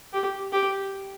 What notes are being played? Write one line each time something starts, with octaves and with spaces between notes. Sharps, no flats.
G4
G4